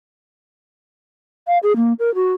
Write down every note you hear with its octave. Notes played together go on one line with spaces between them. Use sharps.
F5
G#4
A#3
A#4
F#4